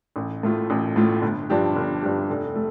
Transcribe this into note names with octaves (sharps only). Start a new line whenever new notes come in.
A1
A2 A3 F4
A1
A2 A3 F4
G1
G2 F3 D4 G4
G1
G2 F3 D4 G4
F1
A3